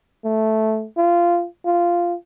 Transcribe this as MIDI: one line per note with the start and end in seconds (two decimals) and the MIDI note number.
0.24 0.86 57
0.97 1.46 65
1.66 2.15 65